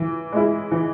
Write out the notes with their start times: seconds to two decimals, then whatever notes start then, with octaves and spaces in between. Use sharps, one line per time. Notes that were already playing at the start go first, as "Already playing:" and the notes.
Already playing: E3
0.32 G#3 E4
0.71 E3